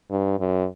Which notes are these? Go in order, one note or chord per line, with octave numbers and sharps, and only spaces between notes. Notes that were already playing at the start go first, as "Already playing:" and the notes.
G2
F#2